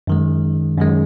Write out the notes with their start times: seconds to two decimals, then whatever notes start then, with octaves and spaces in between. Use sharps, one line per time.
0.07 F#2 D#3 G#3
0.78 F#2 D#3 G#3